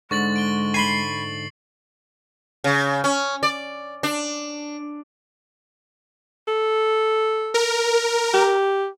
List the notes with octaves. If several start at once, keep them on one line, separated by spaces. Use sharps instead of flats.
G#2 D3 G#3 C#6 A6 F#7
D7 G7
G#5 B5 C6 C7 F#7
C#3
C#4
D5
D4
A4
A#4
G4